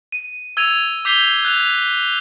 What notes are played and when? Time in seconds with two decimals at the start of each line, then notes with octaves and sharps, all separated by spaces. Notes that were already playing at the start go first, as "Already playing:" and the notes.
0.12 D#7
0.57 E6 G#6 D#7 F7
1.05 D6 G6 B6 C7 F7 G7
1.45 F#6 G#6 F7